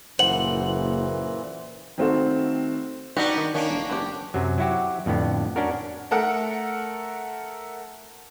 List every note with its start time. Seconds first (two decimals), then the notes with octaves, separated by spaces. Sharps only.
0.19 F#1 A#2 E3 C5 F#5 F#7
1.98 D#3 A3 C4 F#4 A4 C5
3.17 G2 G3 B3 D4 D#4 F#4 G4
3.37 D#3
3.54 D#3 A#3 C#4 D4
3.69 E1
3.90 F#1 B3 G4
4.34 F#2 C3 F#3
4.58 F#3 E4 F#4 G4
5.06 F2 A2 D3 B3
5.56 C#4 D4 F#4 A#4
6.11 A3 A4 A#4 F#5